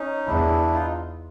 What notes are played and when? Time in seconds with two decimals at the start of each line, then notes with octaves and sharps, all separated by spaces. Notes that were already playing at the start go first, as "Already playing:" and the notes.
Already playing: C#4 D#4
0.27 E2 D4 E4
0.74 D#4 F4